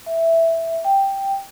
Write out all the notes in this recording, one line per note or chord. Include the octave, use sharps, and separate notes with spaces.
E5
G5